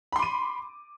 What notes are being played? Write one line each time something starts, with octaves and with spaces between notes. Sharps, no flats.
B5 C6 D6 D#7